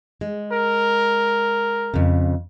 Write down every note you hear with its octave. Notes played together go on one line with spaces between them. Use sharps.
G#3
A#4
F2 C#3